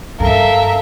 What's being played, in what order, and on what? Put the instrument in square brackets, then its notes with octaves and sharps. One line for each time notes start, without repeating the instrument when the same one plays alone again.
[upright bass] G2 [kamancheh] A4 F5 [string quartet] A#4 E5